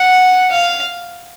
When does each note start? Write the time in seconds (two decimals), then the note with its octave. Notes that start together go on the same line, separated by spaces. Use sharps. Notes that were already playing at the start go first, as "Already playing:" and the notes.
Already playing: F#5
0.51 F5